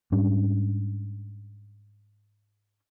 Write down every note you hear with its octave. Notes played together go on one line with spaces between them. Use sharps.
G#2 G3 C#4 D4